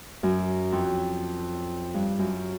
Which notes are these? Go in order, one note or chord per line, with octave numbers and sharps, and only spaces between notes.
F#2
F2
G2
F#2